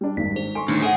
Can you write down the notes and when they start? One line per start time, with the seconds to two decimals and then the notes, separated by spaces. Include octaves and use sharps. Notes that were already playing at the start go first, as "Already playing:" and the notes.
0.01 G3 D4
0.17 G#1 G2 B6
0.36 G#4 C5
0.55 A4 G#5 C6 C#6 D7
0.68 D2 A2 D#3 D4 D#4
0.82 G#4 A4 C5 E5 F#5